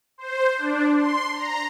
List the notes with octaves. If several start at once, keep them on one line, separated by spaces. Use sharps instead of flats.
C5
D4
C6
A#5